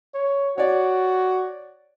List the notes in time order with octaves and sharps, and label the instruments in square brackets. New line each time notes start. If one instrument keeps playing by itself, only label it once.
[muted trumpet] C#5
[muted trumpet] F#4 [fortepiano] C#5 D5